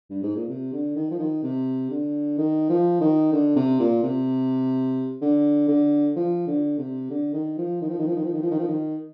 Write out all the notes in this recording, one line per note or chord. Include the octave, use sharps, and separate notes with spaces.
G2
G#2
A#2
C3
D3
D#3
F3
D#3
C3
D3
D#3
F3
D#3
D3
C3
A#2
C3
D3
D3
F3
D3
C3
D3
D#3
F3
D#3
F3
D#3
F3
D#3
F3
D#3
F3
D#3
F3
D#3